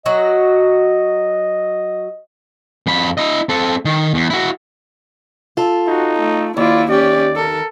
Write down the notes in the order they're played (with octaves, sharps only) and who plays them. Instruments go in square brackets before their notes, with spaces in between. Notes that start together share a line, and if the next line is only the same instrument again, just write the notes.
[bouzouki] F#3 F#4 [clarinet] D#5
[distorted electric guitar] F2 B5
E4 D#5
C4 A4
D#3
E2
E4 F#4
[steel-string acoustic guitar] F4 A4
[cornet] D#4 [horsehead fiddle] F#4
[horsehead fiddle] A3
[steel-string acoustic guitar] D#2 [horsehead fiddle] E4 F4 [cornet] D5
[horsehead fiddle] C#4 G4 [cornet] D5
[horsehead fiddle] A4 A#4